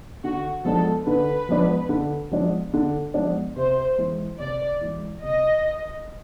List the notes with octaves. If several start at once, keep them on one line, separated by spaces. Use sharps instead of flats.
D3 F#4
F3 G#3 B3 D4 A4
D3 B4
F3 G#3 B3 D4
D3
F3 G#3 B3 D4
D3
F3 G#3 B3 D4
C3 C5
E3 G#3
C3 D5
E3 G#3
C3 D#5